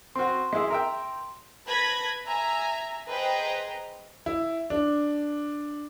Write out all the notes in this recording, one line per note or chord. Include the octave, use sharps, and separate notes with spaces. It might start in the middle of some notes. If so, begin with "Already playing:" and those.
C4 F#4 C6
G#3 E4 G#4
A#4 E5 G5
B4 A5 B5 G#6 A#6
E5 G#5 A#5
G#4 B4 C5 D#5 G5 A#5
E4
D4